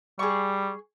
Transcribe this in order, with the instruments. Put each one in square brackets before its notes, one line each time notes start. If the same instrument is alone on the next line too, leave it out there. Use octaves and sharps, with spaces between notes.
[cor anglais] G3 [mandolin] G#4 C#6